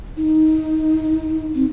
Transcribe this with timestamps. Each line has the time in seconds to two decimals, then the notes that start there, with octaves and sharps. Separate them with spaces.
0.17 D#4
1.55 C4